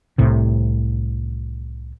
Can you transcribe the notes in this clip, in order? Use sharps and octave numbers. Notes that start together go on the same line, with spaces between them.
C2 A2 C3